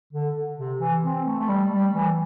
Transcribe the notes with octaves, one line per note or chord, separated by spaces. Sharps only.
D3
C3
E3
C4
A3
A3
G3
G3
E3